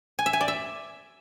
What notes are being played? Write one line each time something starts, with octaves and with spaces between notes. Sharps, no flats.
G#5
E5
G#5
D5
E5